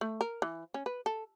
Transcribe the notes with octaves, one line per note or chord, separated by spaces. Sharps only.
A3
A#4
E3
C#4
B4
A4